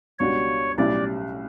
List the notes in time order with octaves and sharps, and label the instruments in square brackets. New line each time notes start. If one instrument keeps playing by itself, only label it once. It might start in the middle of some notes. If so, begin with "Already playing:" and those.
[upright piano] C#2 B2 G3 D4 F#4 [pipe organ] C#5
[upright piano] B1 A2 G3 C#4 E4 [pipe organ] D5